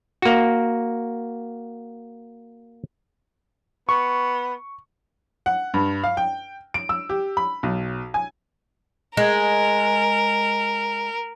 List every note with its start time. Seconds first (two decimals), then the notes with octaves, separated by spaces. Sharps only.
0.22 A#3 F#4
3.89 B3 C#6
5.46 F#5
5.74 G2
6.04 F5
6.17 G5
6.74 D7
6.89 E6
7.09 G4
7.37 B5
7.63 B1
8.14 G#5
9.17 G#3 A#4